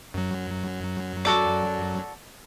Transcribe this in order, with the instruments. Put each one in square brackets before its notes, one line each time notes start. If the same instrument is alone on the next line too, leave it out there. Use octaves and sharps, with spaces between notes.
[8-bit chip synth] F#2 F#3
[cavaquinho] F#4 A4 D5